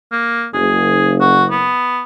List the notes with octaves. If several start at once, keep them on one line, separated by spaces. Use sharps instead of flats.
A#3
F#1 G#4
F#4
B3